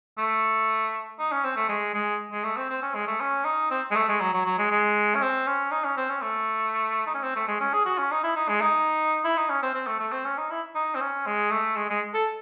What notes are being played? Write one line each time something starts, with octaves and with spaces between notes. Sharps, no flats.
A3
D#4
C#4
C4
A3
G#3
G#3
G#3
A3
C4
C4
C#4
G#3
A3
C#4
D#4
C4
G#3
A3
G#3
F#3
F#3
F#3
G#3
G#3
C#4
C4
C#4
D#4
C#4
C4
C#4
A3
D#4
C#4
C4
A3
G#3
C#4
G#4
F#4
C#4
D#4
E4
D#4
G#3
D#4
E4
D#4
C#4
C4
C4
A3
A3
C4
C#4
D#4
E4
D#4
C4
C#4
G#3
A3
G#3
G#3
A4